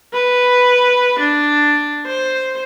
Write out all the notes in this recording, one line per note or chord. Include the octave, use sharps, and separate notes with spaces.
B4
D4
C5